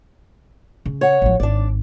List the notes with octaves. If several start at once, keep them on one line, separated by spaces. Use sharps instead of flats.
C#3
C#5 F#5
A1 F3
G#1 D4 D5